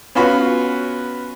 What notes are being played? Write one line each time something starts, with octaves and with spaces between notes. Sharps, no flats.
B3 C#4 F4 F#4 B5